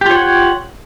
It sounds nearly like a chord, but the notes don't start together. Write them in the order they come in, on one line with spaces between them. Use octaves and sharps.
G4 F4 C#5 F#5